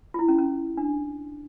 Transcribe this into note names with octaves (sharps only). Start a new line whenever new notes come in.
F4
E4
C#4
C#4
D4